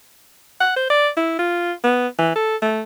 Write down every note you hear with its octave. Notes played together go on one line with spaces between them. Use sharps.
F#5
C5
D5
E4
F4
B3
E3
A4
A3